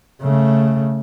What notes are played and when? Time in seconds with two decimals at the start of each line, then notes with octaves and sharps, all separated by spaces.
0.22 C#3 A3